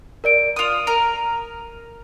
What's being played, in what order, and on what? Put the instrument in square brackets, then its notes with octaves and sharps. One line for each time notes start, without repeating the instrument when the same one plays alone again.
[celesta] A#4 D5 D7
[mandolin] F4 D#6 [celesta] D#7 F7
[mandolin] A#4